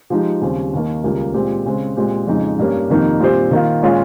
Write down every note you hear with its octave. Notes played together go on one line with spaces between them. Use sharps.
F3 G#3 D#4 G4
D#2 C#3 G3 C4
D#2 D#3 A#3
C#2 C#3 G3 A#3
A#2 G#3 C4 G4
C#3 G#3 C4
A#2 G#3 C4 G4
F2 C#3 G#3 D#4
G2 G3 A#3 C#4
F2 C3 D#3 A#3 D#4
A#2 G3 C4 G4 C5
D#3 A#3 F4
A#2 G#3 C#4 F4